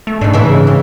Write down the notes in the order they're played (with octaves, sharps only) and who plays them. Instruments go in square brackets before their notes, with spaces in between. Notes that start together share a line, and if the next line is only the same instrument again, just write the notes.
[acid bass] A3
[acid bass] G#2 [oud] D4 D#4
[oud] C#3 E3 E4
C#3